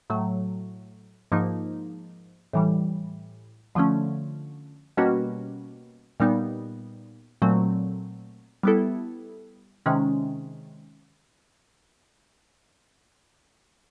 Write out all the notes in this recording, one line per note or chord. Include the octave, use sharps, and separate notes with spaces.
A2 F#3 A3
G#2 F3 A#3 D#4
A2 E3 G3
D3 F3 A3 C#4
B2 G3 A#3 C#4 F#4
A#2 G3 B3 D#4
A#2 F#3 A3 C4
G3 B3 E4 A4
C3 D#3 G#3 C#4